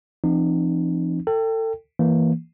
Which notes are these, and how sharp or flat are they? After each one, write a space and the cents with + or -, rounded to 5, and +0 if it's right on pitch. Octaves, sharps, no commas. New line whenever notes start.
F3 -45 C4 +0 D#4 -35
A4 +30 G5 +0
E3 +0 A#3 +0